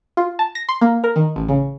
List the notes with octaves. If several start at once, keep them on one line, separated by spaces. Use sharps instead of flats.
F4
A5
A#6
C6
A#3
A#4
D#3
A1
C#3